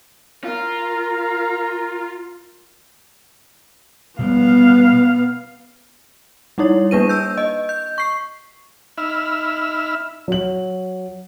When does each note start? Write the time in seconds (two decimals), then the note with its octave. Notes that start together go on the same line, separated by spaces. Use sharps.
0.44 F4 A#4
4.19 B2 G3 G#3 B3 F5
6.58 G3 D#4 E4 C#5
6.91 A#3 D4 B4 D#7
7.09 E6 G6
7.38 D#5
7.69 G6
7.98 C#6 C7
8.98 D#4 E5 B5 E6 F6
10.28 F#3 F#7